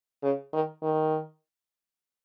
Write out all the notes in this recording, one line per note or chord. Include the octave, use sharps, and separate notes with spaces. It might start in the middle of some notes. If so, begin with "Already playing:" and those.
C#3
D#3
D#3